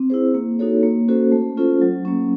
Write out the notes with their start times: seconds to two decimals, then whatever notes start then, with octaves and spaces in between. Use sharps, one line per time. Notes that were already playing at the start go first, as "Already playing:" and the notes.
Already playing: C4
0.10 E4 G#4 C5
0.34 A#3
0.59 D#4 F#4 A4 C#5
0.83 A#3
1.08 C#4 F#4 A4 C5
1.32 A3
1.57 C#4 F4 A4 C5
1.82 F#3
2.05 A#3 C#4